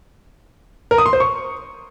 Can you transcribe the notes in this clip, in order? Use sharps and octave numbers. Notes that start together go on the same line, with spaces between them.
A#4
D#6
C6
C5
C#6